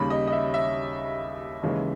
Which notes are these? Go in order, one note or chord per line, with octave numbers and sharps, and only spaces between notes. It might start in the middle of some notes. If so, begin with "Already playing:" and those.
Already playing: D#2 C#3 G3 B5
D#5
D#5
E5
E5
D#2 C#3 E3 G#3